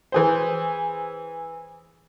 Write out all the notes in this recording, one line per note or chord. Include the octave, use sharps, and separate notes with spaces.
E3 G#4 C5